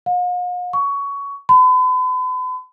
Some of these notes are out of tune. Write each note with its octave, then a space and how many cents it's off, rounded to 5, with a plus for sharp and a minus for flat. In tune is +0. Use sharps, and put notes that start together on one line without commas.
F5 +45
C#6 +15
B5 +40